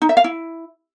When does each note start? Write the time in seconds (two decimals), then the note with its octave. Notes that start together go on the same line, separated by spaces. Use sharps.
0.02 D#4
0.09 E5
0.17 F5
0.24 E4